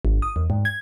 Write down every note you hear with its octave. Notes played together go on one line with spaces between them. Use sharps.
G#1
D#6
E2
G#2
G#6